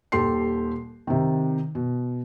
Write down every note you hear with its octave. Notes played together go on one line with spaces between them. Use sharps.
D#1 D#2 G4 A4 C6 C7
C3 D#3
B2